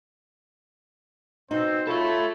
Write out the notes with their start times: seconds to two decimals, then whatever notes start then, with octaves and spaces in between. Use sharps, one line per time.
1.51 B2 C4 D#4 F#4 C5
1.87 F4 A4 C#5 E5 B5